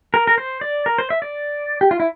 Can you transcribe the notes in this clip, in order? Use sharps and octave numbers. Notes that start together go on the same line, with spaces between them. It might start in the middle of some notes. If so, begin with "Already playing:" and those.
A#4
A#4
C5
D5
A#4
C5
E5
D5
G4
F4
E4